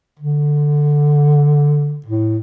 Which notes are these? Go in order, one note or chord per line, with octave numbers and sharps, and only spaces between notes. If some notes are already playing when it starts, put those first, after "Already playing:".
D3
A2